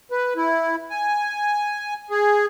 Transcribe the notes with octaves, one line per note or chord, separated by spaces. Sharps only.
B4
E4
G#5
G#4